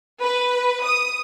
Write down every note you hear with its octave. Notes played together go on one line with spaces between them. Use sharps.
B4
D#6